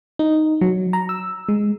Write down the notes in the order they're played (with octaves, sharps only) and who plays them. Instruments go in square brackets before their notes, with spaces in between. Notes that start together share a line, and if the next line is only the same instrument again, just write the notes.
[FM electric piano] D#4
F#3
A#5
E6
G#3